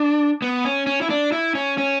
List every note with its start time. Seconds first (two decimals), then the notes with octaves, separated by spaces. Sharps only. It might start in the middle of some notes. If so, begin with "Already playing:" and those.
Already playing: D4
0.42 B3
0.65 C#4
0.87 C#4
1.02 E4
1.10 D4
1.32 E4
1.55 C#4
1.78 C#4